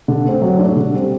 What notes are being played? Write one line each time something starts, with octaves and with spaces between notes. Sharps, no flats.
D3
A3 C4
F#3
A3 D4
D3
G3 C4